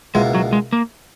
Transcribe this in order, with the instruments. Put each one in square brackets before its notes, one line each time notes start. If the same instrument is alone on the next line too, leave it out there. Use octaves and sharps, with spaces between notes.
[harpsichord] C#2 B2 A#3 E4 [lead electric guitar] G#3
[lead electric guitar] F#3
G#3
A#3